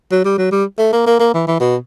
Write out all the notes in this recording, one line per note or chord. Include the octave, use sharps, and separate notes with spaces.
F#3
G3
F#3
G3
A3
A#3
A#3
A#3
E3
E3
B2